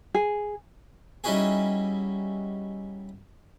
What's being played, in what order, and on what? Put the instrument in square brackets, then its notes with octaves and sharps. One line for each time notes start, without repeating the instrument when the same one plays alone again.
[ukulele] G#4
[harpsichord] G3 C#4 D#4 E4 F#4 G#4